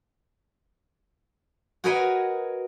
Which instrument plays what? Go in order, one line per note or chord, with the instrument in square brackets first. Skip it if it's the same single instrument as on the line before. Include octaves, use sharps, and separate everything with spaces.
[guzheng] F#4 G#4 A#4 B4 C#5 D#5